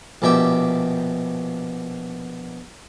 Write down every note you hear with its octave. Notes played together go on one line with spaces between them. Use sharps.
A#1 B2 G4 E5